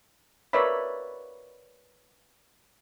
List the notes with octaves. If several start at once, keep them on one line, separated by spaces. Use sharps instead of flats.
A#4 B4 C#5 D5 E5 B5